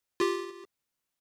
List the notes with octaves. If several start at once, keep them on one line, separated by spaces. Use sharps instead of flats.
F4 G4